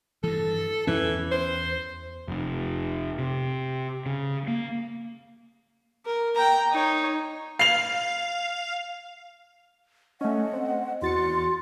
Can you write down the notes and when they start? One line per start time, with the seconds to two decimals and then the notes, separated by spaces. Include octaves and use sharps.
0.24 G2 E3 A4
0.87 E2 E3 C#4
1.31 C5
2.28 F1
3.19 C3
4.06 C#3
4.47 A#3
6.06 A#4
6.35 G5 A#5
6.72 D#4 C#5
7.59 F5 C7 F7
10.21 A3 C#4 D#5 F#5
10.53 C4
11.02 E2 F#4 C6 A6 C#7